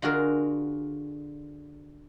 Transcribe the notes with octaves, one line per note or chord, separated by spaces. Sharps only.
D3 F4 F#4 G#4 A#4